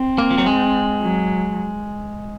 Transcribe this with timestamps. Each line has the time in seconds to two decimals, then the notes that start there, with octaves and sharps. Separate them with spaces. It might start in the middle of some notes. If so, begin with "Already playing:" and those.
Already playing: C4
0.18 A#3
0.31 F3
0.38 F#3
0.46 G#3
1.02 F#3